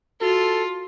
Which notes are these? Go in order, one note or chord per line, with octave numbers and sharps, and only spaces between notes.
F4 F#4 A4